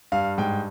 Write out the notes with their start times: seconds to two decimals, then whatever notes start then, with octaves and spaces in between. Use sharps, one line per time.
0.12 G2 F5
0.38 G#2 G5